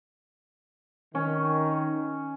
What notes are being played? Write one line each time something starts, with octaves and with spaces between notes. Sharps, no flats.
D#3 C#4